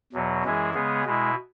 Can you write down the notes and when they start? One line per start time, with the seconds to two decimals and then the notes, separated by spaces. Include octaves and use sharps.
0.13 E2 B2 F#3
0.43 F#2 E3 G#3 E4 G#4
0.74 C#3 G#3 B3 G#4
1.05 B2 G#3 E4